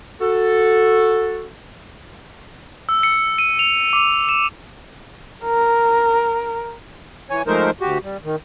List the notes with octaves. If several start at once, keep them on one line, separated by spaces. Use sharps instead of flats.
F#4 A4
E6
C#7
D#7
F7
D6
E7
A#4
E3 C#5 G#5
F3 G#3 A3 D#4 A#4 C5
D2 F#4 G4
G3
D#3